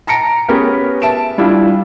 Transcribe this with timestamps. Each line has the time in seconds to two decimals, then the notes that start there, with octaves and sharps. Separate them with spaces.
0.07 A5 A#5 A#6 C#7 D7
0.49 B3 C#4 G4 G#4 A#4 B4
1.02 E5 A5 D7 E7
1.38 G3 D4 E4 F4